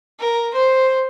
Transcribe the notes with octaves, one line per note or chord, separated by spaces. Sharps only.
A#4
C5